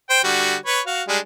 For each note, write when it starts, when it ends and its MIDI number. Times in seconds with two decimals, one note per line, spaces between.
0.10 0.21 72
0.10 0.21 79
0.24 0.56 50
0.24 0.56 55
0.24 0.56 66
0.66 0.80 71
0.66 0.80 73
0.86 1.03 66
0.86 1.03 77
1.08 1.18 55
1.08 1.18 56
1.08 1.18 62